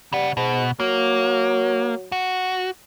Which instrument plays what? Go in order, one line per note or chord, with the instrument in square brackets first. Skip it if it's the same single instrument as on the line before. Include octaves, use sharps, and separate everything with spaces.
[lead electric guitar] C#3 F#5 [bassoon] G3
[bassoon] G#2 [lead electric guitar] B2
[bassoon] F#3 [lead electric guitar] A#3
[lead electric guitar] F#4